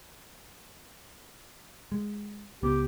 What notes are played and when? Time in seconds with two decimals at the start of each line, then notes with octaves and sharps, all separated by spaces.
1.92 G#3
2.63 C#2 B3 G4